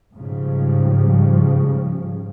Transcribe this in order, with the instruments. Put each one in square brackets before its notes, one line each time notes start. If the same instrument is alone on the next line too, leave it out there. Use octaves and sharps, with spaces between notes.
[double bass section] G#2 C#3 F3 G3